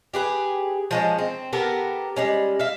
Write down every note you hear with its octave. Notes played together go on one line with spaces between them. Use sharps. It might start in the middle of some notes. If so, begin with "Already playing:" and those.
G4 G#4 B4
F3 G#3 C#4
C4
B3 G4 A4 A#4
G3 G#3 C#4
E5 F5